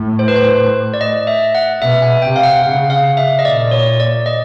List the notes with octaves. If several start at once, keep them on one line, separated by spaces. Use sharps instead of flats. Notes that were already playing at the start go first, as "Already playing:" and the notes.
Already playing: A2
C5
B4
C5
D5
D#5
E5
F#5
B2 E5
G#5
C3 G5
F5
F#5
F5
C#3 F#5
F5
E5
D#5
A#2 D5
C#5
D5
D#5